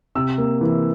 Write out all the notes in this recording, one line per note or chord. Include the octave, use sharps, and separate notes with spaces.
C3 E6
A#3
E3